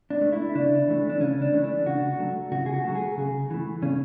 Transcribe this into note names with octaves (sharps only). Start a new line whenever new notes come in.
D4
A3
E4
C#3 D4
E3 A3
D4
C#3 C#4
D4
E3 A3
D4
C#3 F#4
F#3 A3
C#3 F#4
G#4
F#4
F#3 A3
G#4
C#3
E3 A3
C#3 C#4